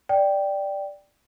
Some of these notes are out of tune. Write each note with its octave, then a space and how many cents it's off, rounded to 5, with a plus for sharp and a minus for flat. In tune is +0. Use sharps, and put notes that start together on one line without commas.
D5 +0 G5 +0